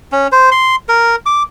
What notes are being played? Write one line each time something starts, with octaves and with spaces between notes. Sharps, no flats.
C#4
C5
C6
A#4
D6